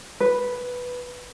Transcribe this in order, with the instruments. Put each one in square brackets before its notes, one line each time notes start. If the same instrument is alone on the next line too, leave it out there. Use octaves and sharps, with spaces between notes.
[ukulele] B4